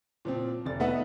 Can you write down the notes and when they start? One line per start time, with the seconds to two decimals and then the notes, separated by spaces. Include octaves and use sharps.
0.25 A#2 F3 C4
0.65 F1 D5 A6
0.80 A3 B3 D#4 B4 E5 F#5